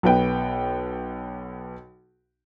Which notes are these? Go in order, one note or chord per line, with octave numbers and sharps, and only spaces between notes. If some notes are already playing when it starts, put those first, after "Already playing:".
B1 B3 B4 G5